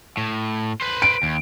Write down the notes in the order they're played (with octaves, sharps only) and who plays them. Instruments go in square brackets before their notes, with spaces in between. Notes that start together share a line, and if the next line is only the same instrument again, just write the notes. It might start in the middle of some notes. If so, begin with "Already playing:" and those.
[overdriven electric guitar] A2
B4 C5
[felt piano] D7
[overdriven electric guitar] D#2